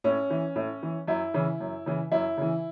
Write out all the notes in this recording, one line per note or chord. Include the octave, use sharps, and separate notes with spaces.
A2 C#4
E3
A2
E3
F#2 E4
C#3 E3
F#2
C#3 E3
F#2 E4
C#3 E3